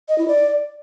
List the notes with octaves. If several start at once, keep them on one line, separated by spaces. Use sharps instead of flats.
D#5
E4
D5